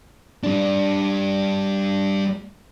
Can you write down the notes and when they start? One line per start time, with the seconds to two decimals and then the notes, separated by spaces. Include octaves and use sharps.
0.44 G3 D4